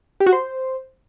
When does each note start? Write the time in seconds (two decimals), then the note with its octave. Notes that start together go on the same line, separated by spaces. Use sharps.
0.20 G4
0.26 F#4
0.33 C5